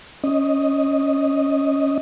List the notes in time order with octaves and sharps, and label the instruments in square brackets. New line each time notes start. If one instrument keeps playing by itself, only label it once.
[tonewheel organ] C#4 D#5